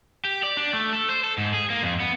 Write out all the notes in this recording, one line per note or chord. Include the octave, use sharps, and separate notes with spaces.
G4
D5
D4
A3
A4
C5
A4
G#2
G#4
A#3
F2
B3